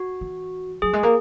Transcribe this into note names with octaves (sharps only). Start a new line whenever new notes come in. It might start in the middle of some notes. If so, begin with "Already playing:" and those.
Already playing: F#4
E3
F#3 G#4
G#3
A#3